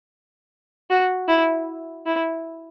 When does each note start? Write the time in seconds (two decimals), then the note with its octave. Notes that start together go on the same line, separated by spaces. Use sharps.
0.90 F#4
1.29 E4
2.06 E4